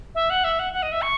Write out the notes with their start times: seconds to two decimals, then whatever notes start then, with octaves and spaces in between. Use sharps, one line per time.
0.15 E5
0.30 F#5
0.44 E5
0.59 F#5
0.73 F#5
0.83 D#5
0.92 E5
1.02 C#6